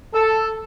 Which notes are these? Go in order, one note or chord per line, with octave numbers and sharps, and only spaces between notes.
A4